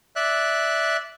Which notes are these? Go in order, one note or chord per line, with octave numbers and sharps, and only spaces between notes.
D5 E5 F#6